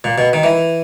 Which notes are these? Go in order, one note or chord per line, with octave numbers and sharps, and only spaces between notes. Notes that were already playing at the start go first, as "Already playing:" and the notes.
A#2
B2
D#3
E3